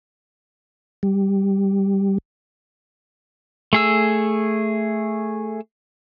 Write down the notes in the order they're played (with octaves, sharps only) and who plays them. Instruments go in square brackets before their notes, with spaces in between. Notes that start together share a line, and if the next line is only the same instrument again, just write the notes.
[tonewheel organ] G3
[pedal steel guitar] A3 G#4 E6